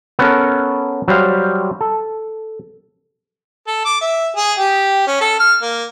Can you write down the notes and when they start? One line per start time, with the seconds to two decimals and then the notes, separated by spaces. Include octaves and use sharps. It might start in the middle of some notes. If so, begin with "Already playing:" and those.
0.19 B3 C#4 A4 A#4
1.08 F#3 G3 C5 F5
1.81 A4
3.67 A4
3.85 D6
4.01 E5
4.36 G#4
4.59 G4
5.07 C#4
5.21 A4
5.40 F6
5.62 A#3